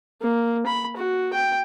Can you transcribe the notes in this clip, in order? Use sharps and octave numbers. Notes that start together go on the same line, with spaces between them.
A#3
B5
F#4
G5